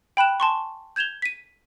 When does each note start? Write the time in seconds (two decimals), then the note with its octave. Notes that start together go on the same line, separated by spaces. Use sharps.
0.17 G5 B5 F#6 E7
0.40 G#5 A5 C6 C#6
0.96 G6 G#6 E7 F7 G7
1.22 B6 D#7